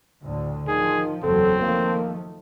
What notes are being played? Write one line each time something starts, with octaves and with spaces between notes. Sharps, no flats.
D2 A2 D3
D#3 F3 G#4
F#1 E2 F#3 C4 A4
D#3 F3 A3 A#3